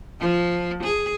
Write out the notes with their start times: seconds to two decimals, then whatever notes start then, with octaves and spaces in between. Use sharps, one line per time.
0.20 F3
0.83 G#4